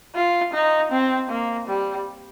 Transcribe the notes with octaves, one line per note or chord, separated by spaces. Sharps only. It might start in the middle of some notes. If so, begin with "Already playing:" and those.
F4
D#4
C4
A#3
G3